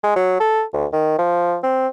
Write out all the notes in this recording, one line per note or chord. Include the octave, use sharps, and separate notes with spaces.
G#3
F#3
A4
D2
D#3
F3
C4